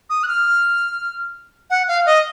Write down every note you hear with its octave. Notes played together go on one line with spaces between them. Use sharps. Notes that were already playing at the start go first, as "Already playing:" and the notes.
D#6
F#6
F6
F#5
F5
D#5